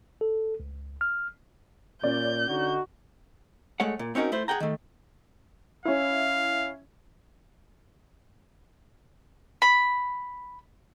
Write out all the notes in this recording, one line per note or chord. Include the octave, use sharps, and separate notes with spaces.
A4
C#2
F6
A#2 C#4 D5 G6
D3 D#4 F#4
G#3 A3 C#5 F#5
A#2
C4 C#4 D#4 F#4 A#4
A3 E4 C5
G#4 F#5 G5 A#5
D#3 A3
C#4 E4 F5
B5